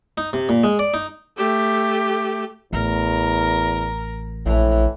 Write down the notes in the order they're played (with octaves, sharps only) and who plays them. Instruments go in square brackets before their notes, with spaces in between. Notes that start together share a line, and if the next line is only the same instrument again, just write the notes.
[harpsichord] D#4
C3
A#2
G#3
D5
D#4
[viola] A3 G4
[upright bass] A1 [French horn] E2 [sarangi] A#4
[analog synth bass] A#1 [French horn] A2 [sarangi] E3